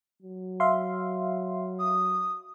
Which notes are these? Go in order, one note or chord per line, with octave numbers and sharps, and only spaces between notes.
F#3
E5 F5 C6
D#6